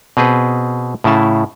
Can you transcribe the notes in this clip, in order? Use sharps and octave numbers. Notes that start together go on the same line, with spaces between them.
B2 C4 G#4 B4
A2 C#3 E4 A5